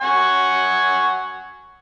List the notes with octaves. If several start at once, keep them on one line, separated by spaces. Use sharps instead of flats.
F#5 G#5 C#6